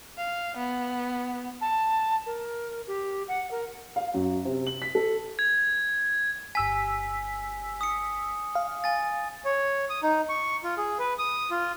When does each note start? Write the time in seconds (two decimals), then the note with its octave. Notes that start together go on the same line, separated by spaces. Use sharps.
0.17 F5
0.57 B3
1.61 A5
2.26 A#4
2.87 G4
3.28 F#5
3.51 A#4
3.96 F5
4.14 F#2
4.45 C3
4.67 F#7
4.82 B6
4.95 A4
5.39 G#6
6.55 G1 G#5 E6 B6
7.81 D#6 C#7
8.55 F5
8.84 G#5 A6
9.45 C#5
9.90 D#6
10.03 D#4
10.29 C#6
10.64 F4
10.77 G#4
10.99 B4
11.19 D#6
11.51 F4